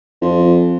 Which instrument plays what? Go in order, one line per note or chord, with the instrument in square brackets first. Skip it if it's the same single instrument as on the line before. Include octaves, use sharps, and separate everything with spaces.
[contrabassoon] F2